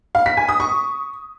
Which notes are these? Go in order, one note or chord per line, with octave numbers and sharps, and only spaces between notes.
F5
B6
G#5
D#6
C#6